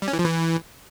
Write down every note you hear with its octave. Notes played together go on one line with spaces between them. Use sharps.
G3
C#4
E3
F3
E3